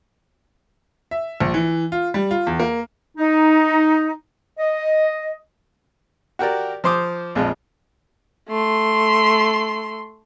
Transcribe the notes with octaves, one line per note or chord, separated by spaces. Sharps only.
E5
A#1
E3
F4
G3
F4
E2
A#3
D#4
D#5
F#4 G4 A#4 D5
F3 C5 C6 D6 D#6
A#1 F2 G#3 F4
A3 C6